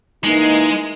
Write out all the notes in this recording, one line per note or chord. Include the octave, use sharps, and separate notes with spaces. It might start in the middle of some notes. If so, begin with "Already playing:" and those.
E3 G#3 A#3 D#4